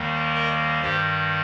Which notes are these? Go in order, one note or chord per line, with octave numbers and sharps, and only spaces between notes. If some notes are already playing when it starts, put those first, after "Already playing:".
Already playing: D#2 D#3 G3 A#3
A#4 D#5
G2 D#3 G3 G4 C5